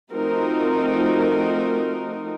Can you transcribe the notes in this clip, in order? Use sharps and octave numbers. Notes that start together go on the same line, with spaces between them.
F3 A3 C4 D#4 F#4 A#4